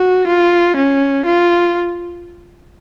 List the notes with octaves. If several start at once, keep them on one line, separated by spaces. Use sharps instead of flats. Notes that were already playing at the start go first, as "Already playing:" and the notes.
Already playing: F#4
F4
C#4
F4